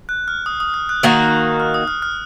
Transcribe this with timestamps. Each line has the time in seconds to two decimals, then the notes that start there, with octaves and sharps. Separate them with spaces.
0.09 F#6
0.28 F6
0.46 D#6
0.60 D#6
0.74 F6
0.89 F#6
1.03 D#3 A#3 D#4 F#4
1.60 F6
1.74 D#6
1.88 F6
2.02 F6